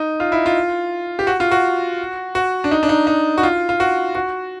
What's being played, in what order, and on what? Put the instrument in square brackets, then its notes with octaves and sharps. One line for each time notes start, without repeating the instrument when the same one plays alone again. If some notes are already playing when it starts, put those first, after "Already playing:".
Already playing: [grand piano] D#4
F4
E4
F4
G4
F#4
F4
F#4
F#4
D4
D#4
D4
D#4
D#4
F#4
F4
F4
F#4
F#4